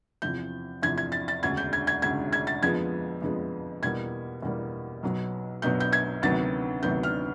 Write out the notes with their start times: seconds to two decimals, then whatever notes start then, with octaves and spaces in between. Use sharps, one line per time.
0.22 E2 C3 F3 G6
0.83 E2 C3 F3 G#6
0.98 G#6
1.12 A6
1.28 A6
1.43 E1 D2 C#3 G#6
1.57 G6
1.73 G#6
1.87 G#6
2.02 E1 D2 C#3 G#6
2.33 G#6
2.47 A6
2.62 F2 D3 F3 G#3 B3 G#6
3.22 F2 D3 F3 G#3 B3
3.82 E2 B2 G3 A#3 G#6
4.42 E2 B2 G3 A#3
5.03 B1 B2 F#3 B3
5.62 B1 B2 F#3 B3 G6
5.80 G6
5.93 G#6
6.22 D2 C3 D#3 F#3 B3 A6
6.83 D2 C3 D#3 F#3 B3 G6
7.03 F6